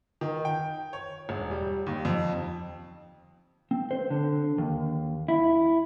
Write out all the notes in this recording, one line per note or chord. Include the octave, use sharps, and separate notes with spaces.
D#3
G5
C#5
E1
G3
D#2
F2
C4
C5
D3
D#2
E4